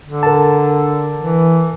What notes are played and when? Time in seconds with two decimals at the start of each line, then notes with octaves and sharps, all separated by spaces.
0.05 D3
0.23 A#4 A5
1.18 E3